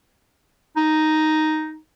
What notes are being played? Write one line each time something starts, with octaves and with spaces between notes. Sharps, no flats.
D#4